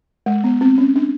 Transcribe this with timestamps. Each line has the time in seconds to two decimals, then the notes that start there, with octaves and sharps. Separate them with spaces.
0.26 G#3
0.44 B3
0.61 C4
0.78 C#4
0.96 D4